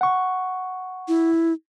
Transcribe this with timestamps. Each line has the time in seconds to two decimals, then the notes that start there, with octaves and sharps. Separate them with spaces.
0.01 F#5 C#6
1.08 E4